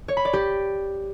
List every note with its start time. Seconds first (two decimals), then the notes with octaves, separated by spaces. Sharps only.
0.08 C#5
0.17 B5
0.25 D5
0.33 G4